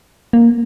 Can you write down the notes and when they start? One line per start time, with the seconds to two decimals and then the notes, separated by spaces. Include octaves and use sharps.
0.33 A#3